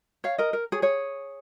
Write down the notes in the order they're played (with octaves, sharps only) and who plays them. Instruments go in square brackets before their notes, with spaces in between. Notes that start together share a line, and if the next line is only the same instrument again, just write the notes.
[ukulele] C#5 F5
A#4 D#5
A#4
G#4 C#5
G#4 C#5